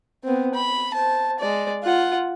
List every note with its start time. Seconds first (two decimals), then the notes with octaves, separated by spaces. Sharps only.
0.24 B3 C4
0.54 B5
0.94 C5 A5
1.39 G#3 D5
1.84 F4 F#5